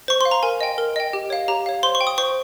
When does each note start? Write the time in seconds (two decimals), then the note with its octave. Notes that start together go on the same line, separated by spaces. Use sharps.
0.08 C5 C#6
0.21 F5 C6
0.31 A#5
0.43 A#4 G#5
0.61 D#5 G5
0.78 A#4
0.96 D#5 G5
1.13 G4
1.30 C#5 F5
1.48 G4 A#5
1.66 C#5 F5
1.83 C5 C6
1.95 C#6
2.01 G5
2.07 D#6
2.18 C5 C#6